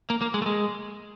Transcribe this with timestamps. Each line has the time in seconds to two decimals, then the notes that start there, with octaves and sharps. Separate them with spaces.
0.10 A#3
0.22 A#3
0.34 G#3
0.42 A3
0.46 G#3